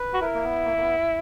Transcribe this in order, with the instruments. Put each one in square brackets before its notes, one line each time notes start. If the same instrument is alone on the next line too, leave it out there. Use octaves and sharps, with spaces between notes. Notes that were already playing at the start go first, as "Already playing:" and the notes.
Already playing: [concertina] B4
[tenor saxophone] F#4
[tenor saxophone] E4 [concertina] A#4
[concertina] A#3
B3
A#3
A#3
B3